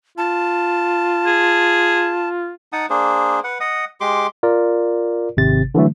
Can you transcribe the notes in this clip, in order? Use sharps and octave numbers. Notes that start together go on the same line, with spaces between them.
F4 A5
G#4
D#4 F#5 A5 D#6
A#3 D4 G#4 C5
B4 F#5
D#5 F#5 D#6
G#3 G4 C6 D6
F4 A#4 D5
G#1 C3 A6
D3 E3 F#3 A3